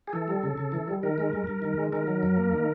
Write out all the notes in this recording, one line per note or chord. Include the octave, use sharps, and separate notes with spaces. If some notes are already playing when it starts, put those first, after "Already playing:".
G#4
E3 A4
G3
C#3
C#3
E3
G3
D#3 A#4
G#3
G2
G2
D#3
G#3
D#3 A#4
F#3
F#2
A#3
D#3